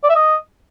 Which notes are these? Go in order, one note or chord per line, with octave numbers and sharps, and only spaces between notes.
D5
E5
D#5